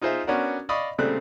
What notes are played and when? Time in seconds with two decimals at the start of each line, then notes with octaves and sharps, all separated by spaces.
0.02 D#4 F4 G#4 C5 D#5 E5
0.27 B3 C#4 D4 F#4 A#4
0.69 D5 D#5 F5 B5 C#6 D#6
0.98 A#2 C#3 G3 A3 C4 F#6